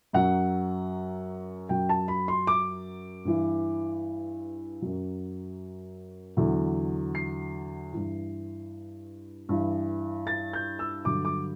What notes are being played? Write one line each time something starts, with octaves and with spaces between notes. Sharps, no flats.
F#2 F#3 F#5
F#2 F#3 G5
A5
B5
C6
D6
G2 E3
F#2 F#3
E2 D3 F#3
C7
G2 E3
G2 E3
A6
G6
E6
G2 D3 F#3 D6
D6